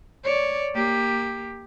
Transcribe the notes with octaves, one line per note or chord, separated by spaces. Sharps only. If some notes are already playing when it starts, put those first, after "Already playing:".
C#5 D5
A#3 G4